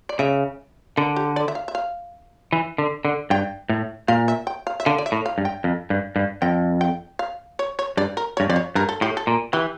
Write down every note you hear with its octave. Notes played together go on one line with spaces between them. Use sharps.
D5
C#3 E5
D3 A#4
G4
D5
E5
F5
E5
F5
E3
D3
D3
G2 G5
A2
A#2 F5
E5
G5
F5
E5
D3 F5
D5
E5
A2
F5
G2
G5
F2
G2
G2
F2 G5
G5
F5
C#5
C#5
G2 D5
A#4
C#5
G2
F2 D5
C#5
G2 A#4
A4
A2 G4
A4
A#2
E3 G4